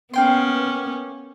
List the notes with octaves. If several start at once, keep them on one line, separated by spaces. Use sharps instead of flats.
A#3 B3 C#4 G5 C6